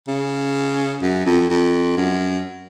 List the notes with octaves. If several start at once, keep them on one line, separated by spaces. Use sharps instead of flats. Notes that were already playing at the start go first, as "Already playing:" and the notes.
C#3
F#2
F2
F2
F#2